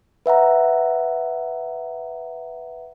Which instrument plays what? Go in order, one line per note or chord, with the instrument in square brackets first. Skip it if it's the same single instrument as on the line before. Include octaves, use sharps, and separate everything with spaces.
[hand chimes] B4 E5 F#5 A#5